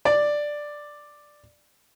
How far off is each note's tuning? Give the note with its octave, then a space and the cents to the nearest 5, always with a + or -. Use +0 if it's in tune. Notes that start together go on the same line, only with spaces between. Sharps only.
D5 +5